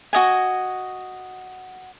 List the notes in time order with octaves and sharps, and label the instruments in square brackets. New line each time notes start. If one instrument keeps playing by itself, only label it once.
[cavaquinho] F#4 D#5 G#5